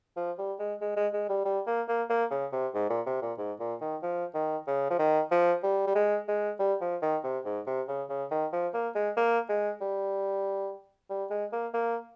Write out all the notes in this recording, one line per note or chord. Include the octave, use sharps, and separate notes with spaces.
F3
G3
G#3
G#3
G#3
G#3
G3
G3
A#3
A#3
A#3
C#3
C3
G#2
A#2
C3
A#2
G#2
A#2
D#3
F3
D#3
C#3
F3
D#3
F3
G3
G3
G#3
G#3
G3
F3
D#3
C3
G#2
C3
C#3
C#3
D#3
F3
A#3
G#3
A#3
G#3
G3
G3
G#3
A#3
A#3